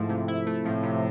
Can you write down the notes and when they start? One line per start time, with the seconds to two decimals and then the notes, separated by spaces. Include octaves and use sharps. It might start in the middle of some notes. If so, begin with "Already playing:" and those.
Already playing: G#2 F3 A3 E4
0.09 C3
0.28 E4
0.46 A3
0.65 A2 F3
0.83 C3